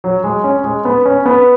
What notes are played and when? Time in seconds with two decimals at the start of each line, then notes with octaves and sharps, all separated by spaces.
0.04 F#3
0.24 G#3
0.44 C#4
0.64 G#3
0.85 B3
1.05 C#4
1.26 B3